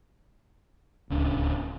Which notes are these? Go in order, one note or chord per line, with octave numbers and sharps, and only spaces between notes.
D1 C#2 C#4 D4